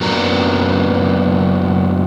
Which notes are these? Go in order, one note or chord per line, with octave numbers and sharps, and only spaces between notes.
F#2 F#3 A#3 B3 D4 A#5